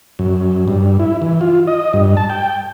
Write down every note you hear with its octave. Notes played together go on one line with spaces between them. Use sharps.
F#2
G2
E4
E3
F4
D#5
G2
A5
G5